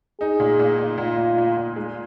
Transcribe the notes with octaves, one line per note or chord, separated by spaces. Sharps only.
D#4 G#4
A#2
A#2
A#2
A#2 F4
A#2
A#2
A#2
G#3